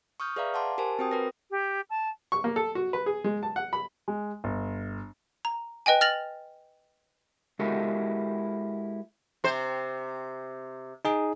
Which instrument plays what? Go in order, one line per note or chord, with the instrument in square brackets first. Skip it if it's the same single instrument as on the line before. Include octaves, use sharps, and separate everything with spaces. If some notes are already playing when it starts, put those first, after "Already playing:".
[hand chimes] C#6 D#6 F6 G6
G#4 B4 D5 E5 F5 A#5
F#5 A5 C6 D6
G4 A#4 C5 G#5 A5
C4 F#4 C5 G5 D#6
A#4 B4 A#6
[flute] G4
A5
[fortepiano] C#6
A#3
A4
F#4
B4
G#4
G#3
A5
F#5
B5
[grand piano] G#3
G1
[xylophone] A#5
B4 D#5 G5 G#5
F6 A6 A#6 F7 F#7
[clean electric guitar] G#3 E4 F#4 G4 A4 A#4
[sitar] C3 C5
[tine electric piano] D#4 G#4